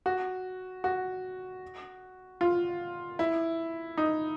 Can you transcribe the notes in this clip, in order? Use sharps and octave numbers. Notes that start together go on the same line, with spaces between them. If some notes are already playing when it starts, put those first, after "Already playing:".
F#4
F#4
F4
E4
D#4